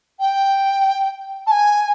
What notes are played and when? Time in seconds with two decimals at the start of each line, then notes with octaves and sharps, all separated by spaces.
0.19 G5
1.46 A5
1.51 G#5